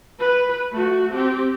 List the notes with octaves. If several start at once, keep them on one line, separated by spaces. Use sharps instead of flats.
B4
A3 F#4
C4 G4